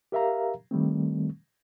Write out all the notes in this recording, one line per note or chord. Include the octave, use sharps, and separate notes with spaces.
G4 A#4 E5 F5 A#5
D#3 G3 A3 C4